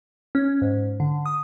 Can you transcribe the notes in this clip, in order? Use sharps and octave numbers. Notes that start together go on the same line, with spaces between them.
C#4
G#2
D3
D#6